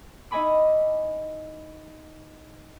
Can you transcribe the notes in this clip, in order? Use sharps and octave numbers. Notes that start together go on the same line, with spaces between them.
D#4 E4 D#5 G#5 B5 D6